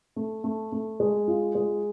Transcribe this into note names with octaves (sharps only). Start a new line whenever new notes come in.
A3
A3
A3
G#3
F4
G#3